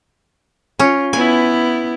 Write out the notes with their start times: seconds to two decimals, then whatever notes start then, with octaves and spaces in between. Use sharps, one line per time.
0.79 C#4 F4
1.13 B3 E4 G#5